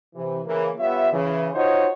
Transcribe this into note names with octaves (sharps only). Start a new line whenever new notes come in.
C3 E3
C#3 E3 A#3
G3 B3 F4 C#5 E5
C#3 E3
D#4 F4 F#4 C5 C#5 D#5